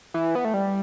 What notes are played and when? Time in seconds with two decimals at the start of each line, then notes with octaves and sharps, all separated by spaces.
0.14 E3
0.35 B3
0.45 A3
0.54 G3